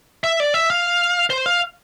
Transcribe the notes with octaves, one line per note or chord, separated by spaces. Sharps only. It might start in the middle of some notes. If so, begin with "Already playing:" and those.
E5
D5
E5
F5
C5
F5